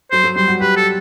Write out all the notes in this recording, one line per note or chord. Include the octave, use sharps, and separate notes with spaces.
F#3 C5
F#3
G3 C5
F#4
G4 B4
A4